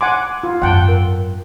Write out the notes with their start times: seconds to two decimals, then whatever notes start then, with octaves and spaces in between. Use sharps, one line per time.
0.01 F#5 G#5 C6 D6
0.43 F4
0.62 G#1 F#2 F#5 G5 A5
0.88 A#4